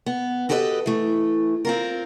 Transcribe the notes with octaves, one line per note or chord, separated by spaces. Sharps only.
B3
F#4 G4 A4 B4 D5 D#5
E3 A3
C4 F4 A#4